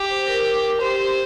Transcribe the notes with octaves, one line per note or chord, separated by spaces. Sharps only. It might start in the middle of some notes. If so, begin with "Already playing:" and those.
Already playing: G4
C5
A#4
G4 C5
G4